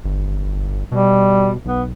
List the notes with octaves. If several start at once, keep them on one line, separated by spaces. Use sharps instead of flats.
G1
B2 G3
B1 B3